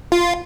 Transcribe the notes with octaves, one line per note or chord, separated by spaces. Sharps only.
F4